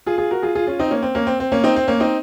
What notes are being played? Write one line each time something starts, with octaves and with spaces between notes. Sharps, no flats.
F4 G#4
F4 G#4
F#4 A#4
F4 G#4
F4 G#4
C#4 F4
C4 D#4
A#3 C#4
C4
A#3 C#4
C4
C4
A#3 C#4
C4 D#4
C4
A#3 C#4
C4 D#4